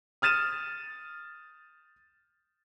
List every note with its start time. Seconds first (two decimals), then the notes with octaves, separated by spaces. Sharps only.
0.22 D#6 F6 A6 D#7 E7